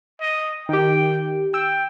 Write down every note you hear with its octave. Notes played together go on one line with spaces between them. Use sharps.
D#5
D#3 G4 G5
G5 E6